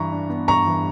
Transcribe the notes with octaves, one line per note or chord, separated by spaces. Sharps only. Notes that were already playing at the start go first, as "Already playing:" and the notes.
Already playing: G2 E3 A#5 C#6
D4
B3
G2 A#5 C#6
E3